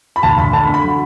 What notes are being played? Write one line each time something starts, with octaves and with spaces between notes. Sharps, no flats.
B5
D2 A5
D2 B5
D3 A5
B5
D3
B5
F#3